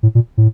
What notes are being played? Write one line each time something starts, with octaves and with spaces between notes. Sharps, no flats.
A2
A#2
A2